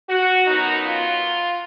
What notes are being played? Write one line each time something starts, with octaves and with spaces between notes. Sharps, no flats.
F#4
F#2 D#3 F#3 B3 D#4
F4